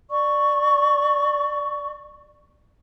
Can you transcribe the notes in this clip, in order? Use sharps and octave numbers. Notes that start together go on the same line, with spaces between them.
D5 C#6